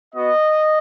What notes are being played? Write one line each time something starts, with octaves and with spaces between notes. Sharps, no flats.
B3 F#4 D#5